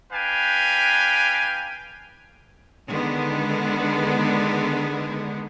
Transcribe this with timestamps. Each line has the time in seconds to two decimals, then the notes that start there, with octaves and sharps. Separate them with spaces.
0.12 D4 B4 F5 G5 G#5
2.89 D3 D#3 G#3 B3